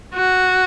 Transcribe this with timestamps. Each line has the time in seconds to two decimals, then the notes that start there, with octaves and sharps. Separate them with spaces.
0.15 F#4